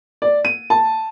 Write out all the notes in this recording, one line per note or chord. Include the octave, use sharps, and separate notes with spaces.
D5
D#7
A5